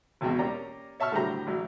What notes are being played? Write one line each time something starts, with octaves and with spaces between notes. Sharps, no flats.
G#1 E2 G#2 B2 G5
A#3 C#4 G4 D5 A#5
C#5 E5 A5 C#6 F6
A2 D3 F#3 G3 C5 A#5
A1 F#3